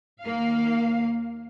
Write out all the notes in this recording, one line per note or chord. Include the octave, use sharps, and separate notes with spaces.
D#2 A#3 F5